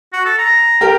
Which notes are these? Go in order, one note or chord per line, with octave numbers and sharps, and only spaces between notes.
F#4
A4
A#5
G4 A#4